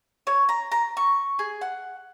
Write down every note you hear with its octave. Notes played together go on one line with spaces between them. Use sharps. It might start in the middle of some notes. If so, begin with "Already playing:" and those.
C#5
A#5
A#5
C#6
G#4
F#5